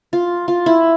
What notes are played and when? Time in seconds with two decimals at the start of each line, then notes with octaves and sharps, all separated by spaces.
0.13 F4
0.48 F4
0.66 E4